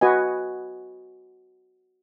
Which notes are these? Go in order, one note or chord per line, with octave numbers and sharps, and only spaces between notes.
F#4 B4 D#5 G#5